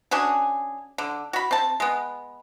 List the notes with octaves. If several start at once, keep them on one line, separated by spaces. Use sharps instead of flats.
C#4 D4 F#4 G#4
D3
F#4 B5
C4 A5
G#3 B3